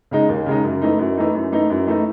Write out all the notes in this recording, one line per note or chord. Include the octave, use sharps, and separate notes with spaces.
C#3 G#3 D#4
D#2
C#3 G#3 D#4
F#2
E3 A3 D#4
F#2
E3 A3 D#4
F#2
E3 A3 D#4
F#2
E3 A3 D#4